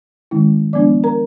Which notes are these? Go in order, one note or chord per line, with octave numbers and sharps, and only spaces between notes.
D#3 G#3 C#4 E4
F3 G#3 B3 D4 D5 D6
A#4 A#5